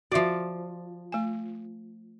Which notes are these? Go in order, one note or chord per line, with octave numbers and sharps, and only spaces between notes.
F3 F#4 D5 E5
A3 G#5